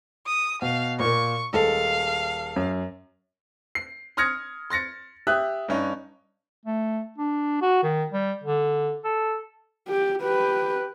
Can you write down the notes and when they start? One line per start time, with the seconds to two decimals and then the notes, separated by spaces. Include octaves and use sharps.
0.26 D#6
0.62 B2 F5
1.00 A#2 A#3 C#6
1.53 D#1 G#3 A4 F5
2.56 F#2
3.75 C7
4.17 C6 D#6 F6 G#6 A#6 C#7
4.70 C6 A6 A#6 C#7
5.27 G4 E5 D#6 F#6
5.69 G2 C#4 D#4
6.65 A3
7.18 D4
7.61 F#4
7.83 D#3
8.12 G3
8.43 D3
9.04 A4
9.88 G4
10.23 G4 B4